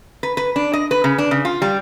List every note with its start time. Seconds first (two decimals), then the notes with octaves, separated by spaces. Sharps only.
0.23 B4
0.37 B4
0.56 D4
0.73 D#5
0.91 B4
1.04 C#3
1.18 D4
1.31 C#3
1.45 F4
1.62 G3